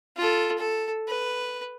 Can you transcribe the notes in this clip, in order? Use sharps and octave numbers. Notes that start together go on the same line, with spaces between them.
F4 A4
A4
B4